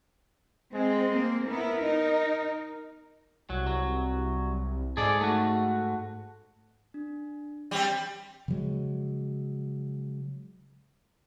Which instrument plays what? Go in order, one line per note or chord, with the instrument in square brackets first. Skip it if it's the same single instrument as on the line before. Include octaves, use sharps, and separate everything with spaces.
[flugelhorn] G#3 [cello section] C4
[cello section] A#3 C4
[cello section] B3 E4 [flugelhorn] A#4
[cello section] D#4
[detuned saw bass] C2 [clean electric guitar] F#3
[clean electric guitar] F#3
[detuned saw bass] G#2 [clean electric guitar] G#4 A4 D5
[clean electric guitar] A3 F#4
[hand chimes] D4
[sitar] G3 C4
[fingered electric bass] C#3 F3 F#3 G#3